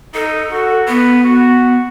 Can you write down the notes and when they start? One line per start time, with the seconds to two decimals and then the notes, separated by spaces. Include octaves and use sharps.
0.14 D#4 A4
0.51 F#4
0.88 B3 B4
1.24 F#4